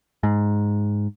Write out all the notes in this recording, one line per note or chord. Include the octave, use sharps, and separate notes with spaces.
G#2